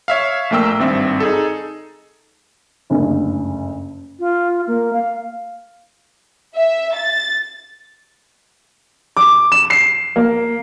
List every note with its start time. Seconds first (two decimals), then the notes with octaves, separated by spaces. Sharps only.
0.08 C#5 E5 F5
0.50 A#1 A3 A#3 G5 E6
0.79 G#1 G2 C4 E5
1.20 D#4 G#4 A4
2.90 F#1 D2 G2
4.19 F4
4.67 A#3
4.93 F5
6.57 E5
6.96 A6
9.17 D6
9.52 E7
9.70 C7
10.16 A#3